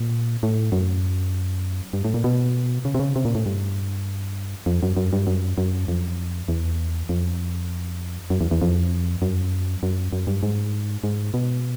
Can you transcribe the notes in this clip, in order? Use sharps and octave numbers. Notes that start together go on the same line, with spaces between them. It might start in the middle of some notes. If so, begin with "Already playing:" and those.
Already playing: A#2
A2
F#2
G2
A2
A#2
B2
C#3
C3
C#3
C3
A#2
A2
G2
F2
F#2
F#2
G2
F#2
F#2
F2
E2
F2
F#2
E2
E2
F2
F#2
F#2
F#2
G2
G#2
G#2
B2